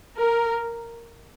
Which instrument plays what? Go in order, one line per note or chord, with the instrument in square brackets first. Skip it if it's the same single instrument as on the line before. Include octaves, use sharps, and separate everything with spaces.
[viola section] A#4